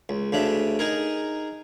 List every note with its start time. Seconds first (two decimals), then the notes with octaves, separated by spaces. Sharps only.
0.09 C#2
0.32 D2 C#3 D4 E5
0.79 D#4 G#4 A#4